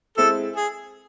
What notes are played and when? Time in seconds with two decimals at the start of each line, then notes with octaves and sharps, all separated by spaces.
0.17 G#3 C4 E4 G#4 A4
0.56 G#4